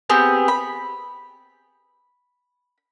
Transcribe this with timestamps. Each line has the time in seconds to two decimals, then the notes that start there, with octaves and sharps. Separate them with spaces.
0.10 B3 C4 G4 G#4
0.48 B5